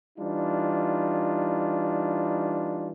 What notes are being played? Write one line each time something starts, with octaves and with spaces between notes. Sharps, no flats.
E3 G3 D4 D#4 F4